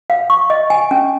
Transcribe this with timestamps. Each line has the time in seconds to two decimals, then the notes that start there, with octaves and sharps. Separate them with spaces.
0.10 F5
0.30 C#6
0.50 D#5
0.70 G#5
0.91 C#4